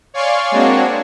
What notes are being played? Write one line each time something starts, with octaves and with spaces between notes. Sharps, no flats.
C#5 D5 F5 G#5 C6 C#6
G#3 A#3 C4 D4 F#4 C#5